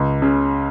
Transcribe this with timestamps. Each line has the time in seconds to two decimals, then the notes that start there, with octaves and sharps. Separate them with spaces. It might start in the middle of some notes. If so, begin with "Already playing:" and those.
Already playing: C#2
0.22 C#3